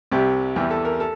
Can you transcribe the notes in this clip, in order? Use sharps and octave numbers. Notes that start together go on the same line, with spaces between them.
C2 C3 G3 G4
E2 E3 G3 G4
A4
A#4
A4